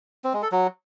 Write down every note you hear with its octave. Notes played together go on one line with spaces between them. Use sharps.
C4
G#3
A4
F#3